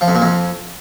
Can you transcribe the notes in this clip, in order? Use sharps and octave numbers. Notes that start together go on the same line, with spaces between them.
F3
F2
A#2
F2